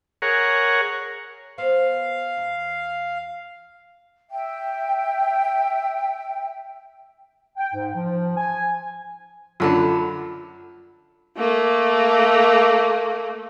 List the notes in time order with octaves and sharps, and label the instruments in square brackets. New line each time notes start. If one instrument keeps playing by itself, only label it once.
[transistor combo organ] G#4 A#4 C#5 F#5
[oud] B3 C5 [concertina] F5
[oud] E2
[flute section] E5 G5
[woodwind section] G5
G#2
F3
G#5
[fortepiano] F#2 D3 D4 [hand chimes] F4 A5 B5
[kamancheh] A3 A#3